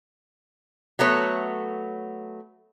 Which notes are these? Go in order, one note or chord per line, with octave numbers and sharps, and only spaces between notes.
F#3 A3 B3 C#5